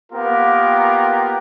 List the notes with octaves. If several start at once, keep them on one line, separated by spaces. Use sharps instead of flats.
A#3 B3 F4 G4 A#4